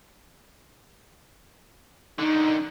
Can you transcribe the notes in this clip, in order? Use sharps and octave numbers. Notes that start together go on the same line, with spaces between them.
D3 D#3 D#4